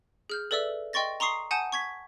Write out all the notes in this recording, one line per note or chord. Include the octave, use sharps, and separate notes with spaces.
G#4 F6 G6
A4 B4 D5 E5 E6
D#5 G5 C6 C#6 A6 A#6
A#5 C6 C#6 D#6 C7
F#5 G#5 A5 D#6 G6
C#6 G#6 B6